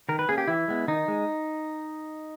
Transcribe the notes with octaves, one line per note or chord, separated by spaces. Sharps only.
D#3 A#4
B4
A#3 C#4 G#4
G4
E3 E4
G#3 B3
D#3 D#4
G#3